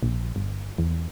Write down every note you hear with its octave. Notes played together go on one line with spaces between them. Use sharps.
A#1
G1
E2